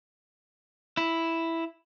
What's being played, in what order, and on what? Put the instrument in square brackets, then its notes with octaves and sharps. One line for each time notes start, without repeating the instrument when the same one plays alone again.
[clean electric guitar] E4